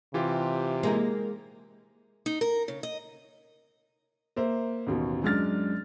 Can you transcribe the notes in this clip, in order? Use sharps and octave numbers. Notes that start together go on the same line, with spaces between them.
C3 E3 F4 G4
G#3 A#3 D#4 A#4
D#4
A#4
C#3
D#5
A#3 C5 E5
A1 D#2 B2
F#2 G#3 D4 F6 A6